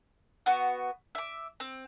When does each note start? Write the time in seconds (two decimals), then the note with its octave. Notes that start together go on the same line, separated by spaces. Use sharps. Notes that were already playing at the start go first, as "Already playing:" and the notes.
0.46 B3 F#4
1.15 E5 D6
1.60 C4